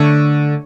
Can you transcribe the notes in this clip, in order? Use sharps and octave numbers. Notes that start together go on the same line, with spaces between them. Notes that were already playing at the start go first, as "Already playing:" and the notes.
Already playing: D3 A3 C#5